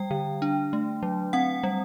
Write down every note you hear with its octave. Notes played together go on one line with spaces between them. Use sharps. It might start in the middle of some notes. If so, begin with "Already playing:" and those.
Already playing: G3 G5
D3
D4
A3
F#3
C4 F#5
G3